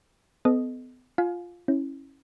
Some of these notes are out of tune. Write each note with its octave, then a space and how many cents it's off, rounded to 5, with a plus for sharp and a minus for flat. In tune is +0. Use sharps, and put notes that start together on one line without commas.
B3 +40 A4 -25 D#5 -5
F4 +0 F5 +20 G#5 +30
C#4 -15 E4 -20